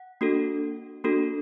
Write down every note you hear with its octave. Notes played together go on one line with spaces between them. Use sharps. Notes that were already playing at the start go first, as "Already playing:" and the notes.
Already playing: F#5
A#3 D4 F#4 A4
A#3 D4 F#4 A4